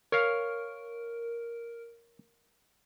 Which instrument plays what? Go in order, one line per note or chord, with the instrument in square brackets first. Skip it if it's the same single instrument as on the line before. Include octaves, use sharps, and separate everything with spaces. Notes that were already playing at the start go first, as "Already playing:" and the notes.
[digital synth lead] A#4 [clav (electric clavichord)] C#5 F5